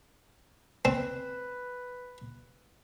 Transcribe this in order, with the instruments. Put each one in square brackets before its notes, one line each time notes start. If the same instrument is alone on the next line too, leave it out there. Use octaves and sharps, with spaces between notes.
[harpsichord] C4 [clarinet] B4